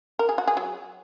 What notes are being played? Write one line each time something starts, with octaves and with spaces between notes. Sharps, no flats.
A#4
G#4
F#4
G#4
F#3